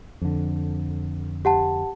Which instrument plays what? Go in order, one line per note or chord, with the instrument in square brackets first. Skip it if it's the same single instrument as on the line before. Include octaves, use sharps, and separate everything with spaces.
[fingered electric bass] F2 D3
[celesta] G4 F#5 A5